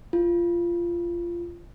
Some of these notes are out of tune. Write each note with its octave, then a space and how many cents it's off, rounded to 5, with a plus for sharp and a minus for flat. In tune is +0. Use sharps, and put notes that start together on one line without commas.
F4 -20